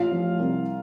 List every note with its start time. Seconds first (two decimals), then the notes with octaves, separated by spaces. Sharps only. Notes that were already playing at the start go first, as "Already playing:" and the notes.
Already playing: A1 F4 F5
0.11 F3
0.39 C2